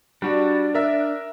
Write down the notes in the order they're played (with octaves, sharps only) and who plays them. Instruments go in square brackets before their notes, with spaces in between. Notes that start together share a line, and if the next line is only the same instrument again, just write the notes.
[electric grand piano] G3 F#4 [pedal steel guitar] D4
[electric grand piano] A#4 E5